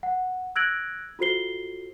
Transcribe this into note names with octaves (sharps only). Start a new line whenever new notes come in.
F#5
E6 F#6 G#6 A#6 D7 F#7
F4 F#4 A4 C5 C7 G7